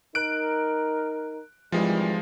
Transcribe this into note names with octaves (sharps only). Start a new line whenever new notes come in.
D#4 A#4 F#6 D7
G#1 E3 F3 G3 G#3